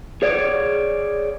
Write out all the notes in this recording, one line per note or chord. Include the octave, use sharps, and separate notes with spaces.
G#4 C#5 D5